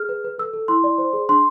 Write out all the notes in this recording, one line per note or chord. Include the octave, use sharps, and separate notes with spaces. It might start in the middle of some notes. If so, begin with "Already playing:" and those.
Already playing: G#4 F6
B4
B4
A4 E6
A4
E4 C6
D5
C5
G#4
D4 C6